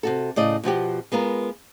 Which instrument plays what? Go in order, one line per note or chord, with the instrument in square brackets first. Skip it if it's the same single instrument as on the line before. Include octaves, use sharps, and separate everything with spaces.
[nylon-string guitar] C3 F#4 A4
A2 C#3 D5 D#5
B2 F3 F#4 G4
G#3 B3 F4 A#4